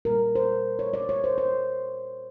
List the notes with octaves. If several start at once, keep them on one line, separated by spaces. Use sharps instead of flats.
A#2 G3 A#3 A#4
C5
C#5
D5
C#5
C5
C5